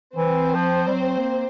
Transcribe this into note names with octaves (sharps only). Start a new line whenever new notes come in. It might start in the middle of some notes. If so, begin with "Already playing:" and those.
E3 C4 C5
F3
G3
F#3
A#3